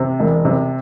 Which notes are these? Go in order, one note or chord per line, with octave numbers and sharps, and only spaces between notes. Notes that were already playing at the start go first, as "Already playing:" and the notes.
Already playing: C3
E1
C3